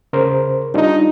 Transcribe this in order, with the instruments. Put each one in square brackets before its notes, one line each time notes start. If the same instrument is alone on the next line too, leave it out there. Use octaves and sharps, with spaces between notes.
[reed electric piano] C#3 A#4 C5
[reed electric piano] G3 D4 F4 [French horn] D#4